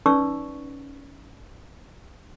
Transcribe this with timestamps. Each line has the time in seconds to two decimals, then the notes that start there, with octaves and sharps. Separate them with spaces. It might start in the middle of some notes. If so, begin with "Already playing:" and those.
0.06 C#4 D#4 B4 D5 C#6 E6